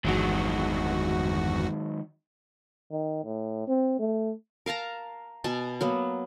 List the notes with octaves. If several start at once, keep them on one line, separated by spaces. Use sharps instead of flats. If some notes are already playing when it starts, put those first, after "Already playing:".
G1 E2 D#3 F#3 G#3 F#4
D#3
A2
C4
A3
A#4 F5 A5 A#5
B2 G#5 A5
F#3 A#3 B3